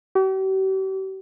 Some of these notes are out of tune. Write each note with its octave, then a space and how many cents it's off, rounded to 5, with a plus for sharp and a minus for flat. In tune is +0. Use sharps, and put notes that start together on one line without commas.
G4 -45